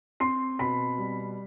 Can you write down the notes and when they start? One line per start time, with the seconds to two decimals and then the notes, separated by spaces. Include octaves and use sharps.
0.20 C4 C6 C7
0.59 B2 B5 B6
0.98 G3